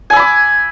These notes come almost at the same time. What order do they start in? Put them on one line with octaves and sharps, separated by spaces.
G#5 E6 B5 D6